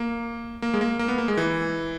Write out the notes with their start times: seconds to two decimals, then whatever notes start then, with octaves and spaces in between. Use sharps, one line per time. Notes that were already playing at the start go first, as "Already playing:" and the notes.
Already playing: A#3
0.62 A#3
0.74 G#3
0.81 A#3
0.99 A#3
1.08 B3
1.18 A#3
1.28 G#3
1.37 E3